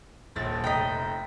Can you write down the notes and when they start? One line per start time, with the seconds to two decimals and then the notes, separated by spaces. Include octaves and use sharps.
0.36 D#1 A#1 A6
0.64 F1 D#5 G5 A#5 B6